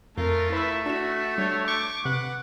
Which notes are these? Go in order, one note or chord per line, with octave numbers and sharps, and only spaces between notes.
F2 A3 F4 A#4
E4 B4 E5 B5
D4 F#4 E5 E7
G3 D4 C#5 G6
C#6 D6 G6
C3 B4 F#5